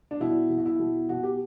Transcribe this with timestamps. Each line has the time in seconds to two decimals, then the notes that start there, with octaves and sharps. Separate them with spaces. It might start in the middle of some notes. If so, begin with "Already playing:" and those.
0.11 D4
0.20 B2 E4
0.50 B2
0.58 F#4
0.66 E4
0.79 B2
1.09 B2 F#4
1.23 G4